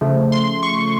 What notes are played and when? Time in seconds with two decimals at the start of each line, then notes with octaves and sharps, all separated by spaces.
0.01 C#3 F3 A3
0.32 C6
0.63 C#6